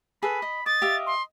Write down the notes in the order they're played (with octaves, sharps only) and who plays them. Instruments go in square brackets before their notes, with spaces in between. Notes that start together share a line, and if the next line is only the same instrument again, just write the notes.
[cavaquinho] G#4 A4 B4 [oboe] B5
[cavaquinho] D#5
[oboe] D#5 [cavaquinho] D6 [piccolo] A6
[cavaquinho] G4 E5 F5
[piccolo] C6